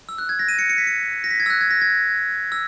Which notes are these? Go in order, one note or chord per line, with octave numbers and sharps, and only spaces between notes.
E6
F#6
G#6
A#6
D#7
C#7
C#7
B6
C#7
A#6
B6
G#6
E6
F#6
G#6
A#6
G#6
E6